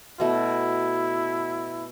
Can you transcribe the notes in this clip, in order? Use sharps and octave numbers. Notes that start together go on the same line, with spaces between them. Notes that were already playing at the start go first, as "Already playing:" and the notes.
B2 A3 E4